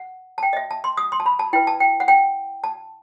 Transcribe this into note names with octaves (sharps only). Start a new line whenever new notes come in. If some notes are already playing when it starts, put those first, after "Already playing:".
Already playing: F#5
A5
G5
D#5
E5
A5
C6
D#6
C6
A5
B5
A5
E4 B4 G5
A5
G5
F#5
G5
A5